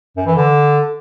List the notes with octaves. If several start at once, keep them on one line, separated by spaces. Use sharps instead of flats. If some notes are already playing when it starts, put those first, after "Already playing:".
F#2
E3
D3